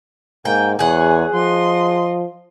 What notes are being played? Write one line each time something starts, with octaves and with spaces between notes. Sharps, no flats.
G#2 A#3 G5 G#5
E2 G#4 C#5 F#5 G#5
F3 D#5 C6